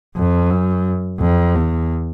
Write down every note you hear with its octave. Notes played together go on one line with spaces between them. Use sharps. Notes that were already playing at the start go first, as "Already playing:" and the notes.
F2
F#2
F2
E2